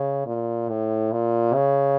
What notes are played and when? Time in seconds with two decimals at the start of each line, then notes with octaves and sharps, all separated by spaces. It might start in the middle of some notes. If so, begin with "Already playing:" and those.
Already playing: C#3
0.26 A#2
0.69 A2
1.12 A#2
1.54 C#3